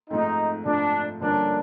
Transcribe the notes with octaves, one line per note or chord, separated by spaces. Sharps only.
G#2 F3 A3 C4 D#4
G#2 F3 A3 C4 D4
G2 D3 F3 A#3 C#4 D4